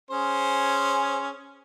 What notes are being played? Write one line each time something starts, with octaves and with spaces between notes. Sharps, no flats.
C#4 G#4 C5